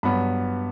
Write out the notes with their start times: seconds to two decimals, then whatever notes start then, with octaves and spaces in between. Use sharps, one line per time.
0.03 G2 F#3 B3 B5